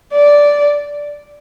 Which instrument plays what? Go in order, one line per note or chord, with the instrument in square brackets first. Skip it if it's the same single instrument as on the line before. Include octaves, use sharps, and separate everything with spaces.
[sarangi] D5